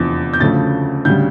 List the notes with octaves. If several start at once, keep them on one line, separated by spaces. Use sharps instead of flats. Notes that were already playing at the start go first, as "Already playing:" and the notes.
Already playing: F1 E2 D3 F3
G6
D2 C#3 F3 A3 A6
D2 C#3 G3 G6